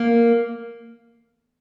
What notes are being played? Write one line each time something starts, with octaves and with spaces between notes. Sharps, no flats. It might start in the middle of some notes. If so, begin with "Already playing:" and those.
Already playing: A#3